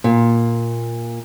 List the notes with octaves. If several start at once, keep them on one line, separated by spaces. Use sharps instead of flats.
A#2